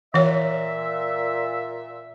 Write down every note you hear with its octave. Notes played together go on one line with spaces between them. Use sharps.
A#2 E3 C#5 E5